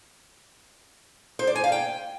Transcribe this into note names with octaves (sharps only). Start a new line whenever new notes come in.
C5
D5
G#5
F5
G5